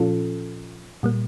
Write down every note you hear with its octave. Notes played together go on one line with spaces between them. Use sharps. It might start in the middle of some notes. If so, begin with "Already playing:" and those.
Already playing: A#2 F3 C#4 F4 A4
A#2 G3 A#3